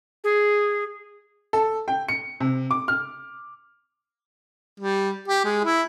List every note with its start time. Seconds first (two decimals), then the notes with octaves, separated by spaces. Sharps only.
0.24 G#4
1.53 A4
1.88 G5
2.09 C#7
2.40 C3
2.71 D6
2.88 F6
4.80 G3
5.28 G4
5.45 G#3
5.64 E4